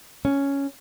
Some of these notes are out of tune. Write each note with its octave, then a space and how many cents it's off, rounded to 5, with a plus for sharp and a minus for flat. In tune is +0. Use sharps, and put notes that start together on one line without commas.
C#4 +5